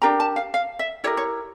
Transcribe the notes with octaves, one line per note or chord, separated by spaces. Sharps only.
D4 G4 A#4 A#5
A5
F5
F5
E5
E4 G4 A#4 C#5
C#5